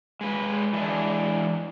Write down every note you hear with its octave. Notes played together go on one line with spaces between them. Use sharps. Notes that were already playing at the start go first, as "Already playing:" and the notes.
G#3 B4
E3 G#3 D4